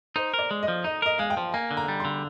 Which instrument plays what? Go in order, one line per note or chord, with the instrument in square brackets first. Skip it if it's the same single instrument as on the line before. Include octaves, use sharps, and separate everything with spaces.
[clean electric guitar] D#4 [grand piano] C5
[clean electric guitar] A#4
[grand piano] D5
[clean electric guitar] G#3
[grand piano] D#5
[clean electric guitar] F3
[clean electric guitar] D#4 [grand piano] D#5
[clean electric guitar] A#4 [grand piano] D#5
[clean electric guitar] G#3 [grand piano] F5
[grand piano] G5
[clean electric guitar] F3
[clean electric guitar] A#3 [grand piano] G#5
[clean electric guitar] D3
[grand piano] A#5
[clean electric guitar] G3
[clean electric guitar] D3 [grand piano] C6